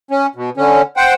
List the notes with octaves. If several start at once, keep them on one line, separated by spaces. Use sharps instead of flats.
C#4
B2
D3 C#4
C5 F#5 G5